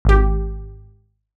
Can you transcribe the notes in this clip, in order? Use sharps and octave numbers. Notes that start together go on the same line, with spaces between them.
G#1 G4